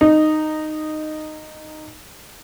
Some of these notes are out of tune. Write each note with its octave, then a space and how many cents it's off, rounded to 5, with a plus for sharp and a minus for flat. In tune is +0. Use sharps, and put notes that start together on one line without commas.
D#4 -10